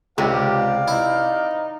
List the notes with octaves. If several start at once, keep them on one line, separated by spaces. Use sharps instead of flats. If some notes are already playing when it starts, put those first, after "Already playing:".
C#2 C3 G4 C5 D5 F5
D#4 E4